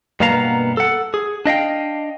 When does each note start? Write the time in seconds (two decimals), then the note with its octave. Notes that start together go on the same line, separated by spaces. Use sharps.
0.20 G2 B2 A#3 B3 F5 A#5
0.77 A4 F#5
1.14 G#4
1.46 D4 D#5 F5 G5